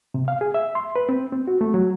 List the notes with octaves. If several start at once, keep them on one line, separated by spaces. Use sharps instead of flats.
C3
F5
G#4
E5
C6
B4
C4
C4
F#4
A3
F#3